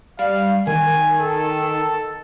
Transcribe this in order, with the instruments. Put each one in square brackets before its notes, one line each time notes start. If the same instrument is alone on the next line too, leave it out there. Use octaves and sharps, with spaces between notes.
[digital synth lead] G3 [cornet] F5
[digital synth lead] D#3 [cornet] G#5
[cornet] A4